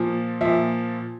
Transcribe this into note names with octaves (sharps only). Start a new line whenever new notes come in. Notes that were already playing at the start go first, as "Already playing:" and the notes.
Already playing: A#2 F3
A#2 F3 E5